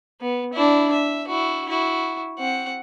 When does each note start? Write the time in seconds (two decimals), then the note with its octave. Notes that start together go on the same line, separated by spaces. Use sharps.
0.21 B3
0.53 D4 E4
0.92 E5
1.27 E4 F#4
1.68 E4 F#4
2.39 C4 F#5